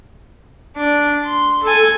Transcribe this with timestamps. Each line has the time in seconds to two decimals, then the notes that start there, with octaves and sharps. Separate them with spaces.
0.77 D4
1.25 C6
1.63 A4 G#5